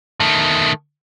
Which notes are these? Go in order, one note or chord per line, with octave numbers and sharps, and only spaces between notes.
D#3 A3